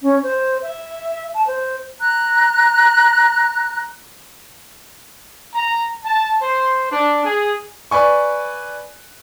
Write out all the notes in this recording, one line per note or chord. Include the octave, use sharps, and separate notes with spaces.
C#4
C5
E5
A5
C5
A#5 F#6
A#5
A5
C5
D4
G#4
B4 D5 G#5 C#6